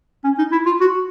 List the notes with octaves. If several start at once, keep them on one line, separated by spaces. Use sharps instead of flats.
C#4
D#4
E4
F4
F#4